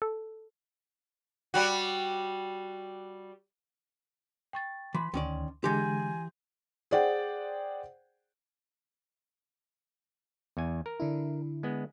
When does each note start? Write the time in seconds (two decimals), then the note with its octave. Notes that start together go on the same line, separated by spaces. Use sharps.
0.02 A4
1.54 G3 F#4
4.53 G5 C#6 A6
4.94 E3 B5 C6
5.14 D2 D#3 C#4 D5
5.64 D3 E3 G#3 G4 G#5 C6 G6 A#6
6.91 G#4 C5 D5 F#5 G5
10.57 E2 G#5
10.86 A#4
11.00 D3 D4 E4
11.63 G#3 B3